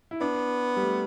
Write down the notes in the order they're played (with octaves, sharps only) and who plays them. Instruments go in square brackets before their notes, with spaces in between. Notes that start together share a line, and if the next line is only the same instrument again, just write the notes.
[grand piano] E4
[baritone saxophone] B3 [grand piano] D4
[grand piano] G3
A3